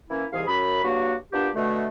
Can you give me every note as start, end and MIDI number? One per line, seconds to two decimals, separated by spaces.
0.09 0.24 52
0.09 0.24 58
0.09 0.24 61
0.09 0.24 64
0.33 0.43 36
0.33 0.43 44
0.33 0.43 52
0.33 0.43 68
0.33 0.43 77
0.46 0.79 42
0.46 0.79 83
0.83 1.14 43
0.83 1.14 54
0.83 1.14 58
0.83 1.14 66
1.33 1.48 46
1.33 1.48 59
1.33 1.48 62
1.33 1.48 67
1.55 1.88 47
1.55 1.88 50
1.55 1.88 57